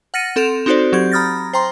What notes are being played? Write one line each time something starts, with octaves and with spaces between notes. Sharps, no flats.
F#5 F6 A6 A#6 C#7 D#7
C4 A4 C6 D7 E7 F7
C4 D#4 F#4 A4 C5 D5
F#3 C4 G4 G6 G#6
A#5 B5 D#6 F6 A6 A#6
C5 G5 A#5 C6